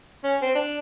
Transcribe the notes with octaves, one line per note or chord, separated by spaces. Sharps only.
C#4
C4
D4